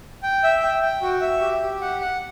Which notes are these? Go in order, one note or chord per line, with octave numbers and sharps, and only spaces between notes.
G5
E5
G5
G5
F#4
E5
G4
G4
F#5
F#5